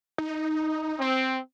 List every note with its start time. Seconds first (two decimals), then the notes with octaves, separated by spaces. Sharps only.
0.18 D#4
1.00 C4